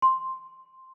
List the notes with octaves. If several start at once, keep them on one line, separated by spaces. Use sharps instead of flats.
C6